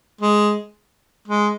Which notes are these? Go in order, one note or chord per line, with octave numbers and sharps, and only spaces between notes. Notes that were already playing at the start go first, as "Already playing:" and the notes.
G#3
G#3